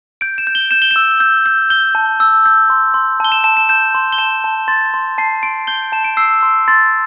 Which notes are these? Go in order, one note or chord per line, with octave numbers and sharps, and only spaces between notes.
G6 D7
E7
G6
G7
G6 E7
G7
E6 E7
G6
G6
G6 G7
A5
E6
G6
C6
C6
A5 G7
E7
A5 E7
E7
G6 E7
C6
G7
A5 E7
A5
C6 A6
C6
A5 C7
C6 D7
G6 G7
A5 E7
D7
E6 C7
C6
C6 A6